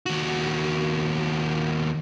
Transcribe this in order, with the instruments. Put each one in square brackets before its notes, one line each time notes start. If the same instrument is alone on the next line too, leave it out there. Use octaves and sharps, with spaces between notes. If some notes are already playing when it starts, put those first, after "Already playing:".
[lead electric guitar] D#2 F#4